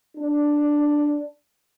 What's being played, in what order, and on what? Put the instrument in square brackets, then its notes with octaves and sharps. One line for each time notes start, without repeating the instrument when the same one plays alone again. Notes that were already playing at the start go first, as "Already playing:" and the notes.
[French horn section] D4